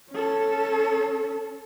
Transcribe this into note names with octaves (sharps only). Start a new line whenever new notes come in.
C#4 A4